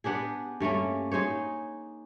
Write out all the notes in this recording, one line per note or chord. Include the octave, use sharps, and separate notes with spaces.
B3 D4 G4 G#4
G2 A3 A#3 C#4
D#4 G#4 C5 C#5